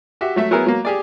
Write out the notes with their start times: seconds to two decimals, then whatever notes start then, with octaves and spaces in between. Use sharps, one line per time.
0.21 F#4 G4 E5
0.36 F#3 A3 E5
0.51 F#3 B3 E4 G#4 A#4
0.66 F#3 A#3
0.85 G4 G#4 D5